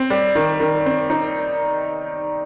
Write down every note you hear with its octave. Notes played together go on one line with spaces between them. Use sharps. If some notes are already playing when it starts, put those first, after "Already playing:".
Already playing: C4
G3
D#3
D#3
C4
D#4